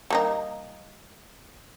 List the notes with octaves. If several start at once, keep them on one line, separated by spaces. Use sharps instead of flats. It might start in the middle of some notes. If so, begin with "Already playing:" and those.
G3 A#3 D#4